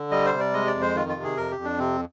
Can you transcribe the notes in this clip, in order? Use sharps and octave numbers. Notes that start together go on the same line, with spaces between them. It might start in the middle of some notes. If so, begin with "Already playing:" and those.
Already playing: D3
G3 D#5
C5
C3
D5
G#3 D#5
D5
F2
C5
D#3 F4
F4
C3
G#4
F2 A#4
G4
F2
D4
C3 C4